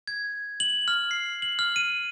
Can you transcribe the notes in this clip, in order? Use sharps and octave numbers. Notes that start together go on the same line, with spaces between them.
G#6
F#7
F6
C7
F#7
F6
D#7